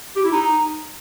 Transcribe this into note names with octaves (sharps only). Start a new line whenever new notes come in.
G4
E4
D#4